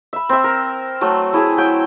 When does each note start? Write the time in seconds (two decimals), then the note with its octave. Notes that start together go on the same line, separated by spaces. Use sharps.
0.13 E5 B5
0.29 C4 E5
0.44 A#4
1.01 F#3 A3
1.33 A3 E4 G#4
1.57 F#3 G5